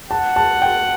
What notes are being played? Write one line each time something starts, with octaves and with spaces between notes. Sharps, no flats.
F#5 A5
A5
G5